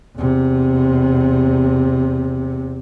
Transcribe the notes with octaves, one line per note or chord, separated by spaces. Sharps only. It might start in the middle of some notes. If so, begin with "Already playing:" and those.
E2 C3